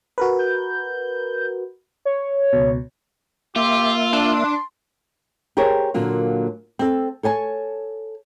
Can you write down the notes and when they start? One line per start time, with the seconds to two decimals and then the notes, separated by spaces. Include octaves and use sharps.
0.18 F#4 A#4 B4
0.39 G6
2.05 C#5
2.53 C#2 B2
3.56 A#3 F4 G4 E5
4.13 D4 C6
5.57 G4 G#4 A#4 C5 C#5
5.94 A#2 D3 F#3 A#3 F4
6.79 C4 A4
7.23 A4 C#5 G#5 A5